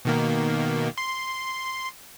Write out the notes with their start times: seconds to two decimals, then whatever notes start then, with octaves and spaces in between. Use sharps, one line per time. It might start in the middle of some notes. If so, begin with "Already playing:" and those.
0.05 B2 D#3 A#3
0.98 C6